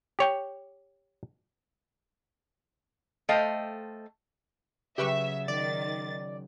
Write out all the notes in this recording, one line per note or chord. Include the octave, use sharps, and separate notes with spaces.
G4 C#5 G5
A3 A4 C5 D#5 F5 G5
C#3 F#3 G4 B4 E5 C#6
D#3 D5 A6